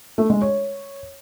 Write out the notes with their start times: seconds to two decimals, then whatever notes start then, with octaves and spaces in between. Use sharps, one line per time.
0.18 A3
0.30 G#3
0.42 C#5